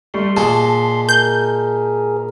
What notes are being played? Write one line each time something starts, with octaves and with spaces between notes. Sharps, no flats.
G3 A3 C6
A#2 G#3 A5
G#4 A#4 G6